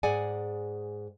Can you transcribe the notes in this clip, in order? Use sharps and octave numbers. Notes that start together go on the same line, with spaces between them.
G#2 G#4 D5 F#5 G#5